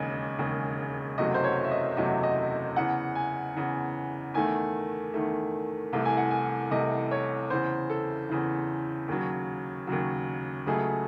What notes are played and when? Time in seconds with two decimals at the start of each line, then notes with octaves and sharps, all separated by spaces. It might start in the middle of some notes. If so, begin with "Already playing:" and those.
Already playing: E1 D#2 C#3 G#3
0.39 E1 D#2 C#3 G#3
1.18 F#1 E2 C3 F#3 A3 D#5
1.34 C5
1.44 C#5
1.64 E5
1.71 D#5
1.96 F#1 E2 C3 F#3 A3 D#5
2.23 D#5
2.76 E2 C#3 E3 F#5
3.15 G#5
3.55 E2 C#3 E3
4.34 E2 D#3 A3 G#5
5.14 E2 D#3 A3
5.93 C2 C3 E3 A3
6.05 G#5
6.17 F#5
6.31 G#5
6.71 C2 C3 E3 A3 D#5
7.11 C#5
7.50 E2 C#3 E3 C5
7.90 A4
8.29 E2 C#3 E3
9.08 D#2 C#3 F#3
9.87 D#2 C#3 F#3
10.66 C#2 C#3 F#3 A3 G#4